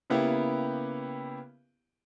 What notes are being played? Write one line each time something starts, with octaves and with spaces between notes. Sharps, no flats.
C#3 A#3 B3 E4 G4